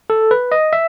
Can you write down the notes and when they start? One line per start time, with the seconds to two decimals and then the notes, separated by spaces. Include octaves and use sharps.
0.10 A4
0.31 B4
0.52 D#5
0.73 E5